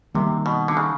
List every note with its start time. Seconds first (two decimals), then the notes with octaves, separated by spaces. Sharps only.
0.14 C3 D#3 G3 A#3
0.46 B2
0.68 D3
0.77 C#3